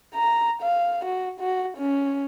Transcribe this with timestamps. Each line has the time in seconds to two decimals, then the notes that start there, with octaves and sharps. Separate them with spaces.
0.14 A#5
0.62 F5
1.05 F#4
1.40 F#4
1.77 C#4